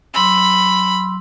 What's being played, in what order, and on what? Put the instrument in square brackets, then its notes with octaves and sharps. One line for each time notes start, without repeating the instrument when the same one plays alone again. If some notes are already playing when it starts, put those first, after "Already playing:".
[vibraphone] F#3 C6 E6 [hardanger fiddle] B5